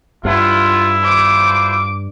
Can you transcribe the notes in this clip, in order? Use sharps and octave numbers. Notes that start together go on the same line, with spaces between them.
G2 E4 F4 F#5
D4 F4 C5 D6